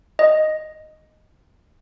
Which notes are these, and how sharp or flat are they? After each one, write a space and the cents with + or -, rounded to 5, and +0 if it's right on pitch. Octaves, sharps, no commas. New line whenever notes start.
D#5 -5